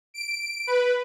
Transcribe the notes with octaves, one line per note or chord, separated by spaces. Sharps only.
D7
B4